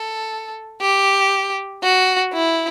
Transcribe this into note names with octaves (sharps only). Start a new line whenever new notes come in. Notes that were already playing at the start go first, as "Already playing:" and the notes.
Already playing: A4
G4
F#4
E4